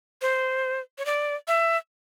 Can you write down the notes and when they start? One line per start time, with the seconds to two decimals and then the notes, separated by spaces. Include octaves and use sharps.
0.22 C5
0.98 C#5
1.06 D5
1.48 E5